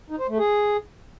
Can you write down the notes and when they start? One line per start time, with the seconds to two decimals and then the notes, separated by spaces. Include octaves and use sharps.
0.10 D#4
0.19 C5
0.29 A3
0.38 G#4